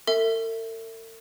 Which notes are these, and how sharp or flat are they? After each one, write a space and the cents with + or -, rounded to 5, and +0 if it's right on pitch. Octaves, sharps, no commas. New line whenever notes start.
A4 +45 E5 +0